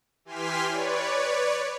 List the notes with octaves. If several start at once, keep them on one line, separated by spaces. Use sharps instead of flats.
E3 G4 G#5 C6 F6 B6
B4 C#5 D5